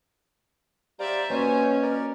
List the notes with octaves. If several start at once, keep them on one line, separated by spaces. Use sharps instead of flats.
G3 C5 D5 E5 F5 A#5
B2 A#3 C#4 C5 C#5 G#5
A#4 D5